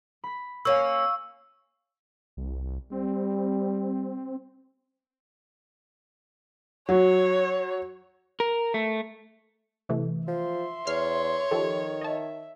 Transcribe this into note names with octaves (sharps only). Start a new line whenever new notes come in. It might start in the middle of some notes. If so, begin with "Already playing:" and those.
B5 B6
A#3 C#4 F5 G#5 C#6 E6
C2
G3 C4
F#3 C#5
A#4
A3
C3 E3 A3
F3 E5 C6
E2 C#5 F6 C7
D#3 F3 G4 A4
D#5 E5 A5